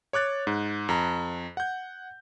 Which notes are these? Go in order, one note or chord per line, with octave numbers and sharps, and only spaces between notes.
C#5 D6 F#6 A6
G#2
F2 A#5
F#5 G6